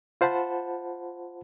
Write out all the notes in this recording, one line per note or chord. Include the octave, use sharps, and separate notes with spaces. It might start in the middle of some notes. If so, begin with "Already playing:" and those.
F4 C5 F#5 A5 B5